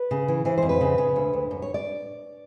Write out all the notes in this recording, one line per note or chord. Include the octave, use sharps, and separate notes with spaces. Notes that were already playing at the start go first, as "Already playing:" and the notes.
Already playing: B4
C#3
E3
E3 C5
F2 C5
B4
C#3
C#3
D2
D2
F#2
C#5
D5